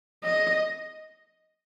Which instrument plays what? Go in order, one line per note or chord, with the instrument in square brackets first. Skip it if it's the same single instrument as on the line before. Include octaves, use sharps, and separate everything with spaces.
[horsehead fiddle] D#5